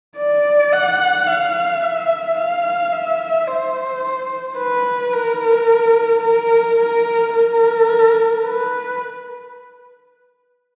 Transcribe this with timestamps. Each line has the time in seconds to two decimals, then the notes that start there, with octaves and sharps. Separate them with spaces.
0.17 D5
0.73 F#5
1.27 F5
1.82 E5
2.38 F5
2.92 E5
3.47 C5
4.58 B4
5.13 A#4
6.23 A#4
6.78 A#4
7.34 A#4
8.44 B4